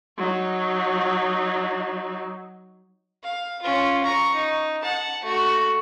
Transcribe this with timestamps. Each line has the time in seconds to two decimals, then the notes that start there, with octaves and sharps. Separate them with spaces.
0.17 F#3 D#4
3.24 F5
3.62 C#4 F4
4.03 A#5 C#6
4.34 D#4
4.82 F#5 A5
5.23 A3 F#4